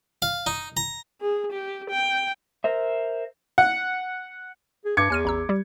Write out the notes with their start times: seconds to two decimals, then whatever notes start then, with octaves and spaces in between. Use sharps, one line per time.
0.22 F5
0.47 D#4
0.77 A#5
1.21 G#4
1.52 G4
1.90 G5
2.64 A#4 C5 E5
3.58 F#5
4.85 G#4
4.97 G2 D6 G#6 C#7
5.10 E2 G#5 F6 D#7
5.25 A1 A#5 E6
5.49 G3 G4